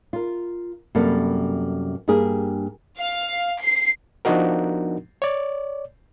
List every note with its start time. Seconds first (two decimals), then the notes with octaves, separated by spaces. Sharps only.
0.13 F4 A#4
0.95 F#2 C3 G3 A#3 A4 B4
2.08 G2 A#3 G4 G#4 A#4
2.98 F5
3.60 C7
4.25 F3 B3 D4 D#4 F#4 A#4
5.22 C#5 D5